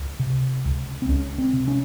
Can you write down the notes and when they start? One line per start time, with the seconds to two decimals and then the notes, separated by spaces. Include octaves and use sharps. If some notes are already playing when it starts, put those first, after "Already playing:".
Already playing: C#2
0.19 C3
0.65 C#2
1.02 C4
1.09 C#2 C#4
1.38 C4
1.53 C3
1.68 C#4